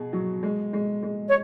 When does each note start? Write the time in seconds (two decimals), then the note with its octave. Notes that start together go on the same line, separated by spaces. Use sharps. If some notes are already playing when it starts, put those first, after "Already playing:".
Already playing: B2 G#4
0.13 F#3
0.43 G#3
0.73 G#3
1.03 G#3
1.28 C#5